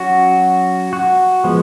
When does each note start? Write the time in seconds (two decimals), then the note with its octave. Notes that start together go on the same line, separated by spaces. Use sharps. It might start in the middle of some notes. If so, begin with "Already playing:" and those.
Already playing: F#3 C#4 F#4
0.93 F#4
1.44 F3 G#3 B3